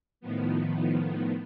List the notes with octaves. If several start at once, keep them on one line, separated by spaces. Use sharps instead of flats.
A2 D#3 F3 B3